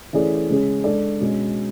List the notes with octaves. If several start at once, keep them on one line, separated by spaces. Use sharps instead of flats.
E3 A3 C#4 G#4 D5
C#3 G#3 C#4 G#4
G#3 D4 A4 D5
B2 G#3 C#4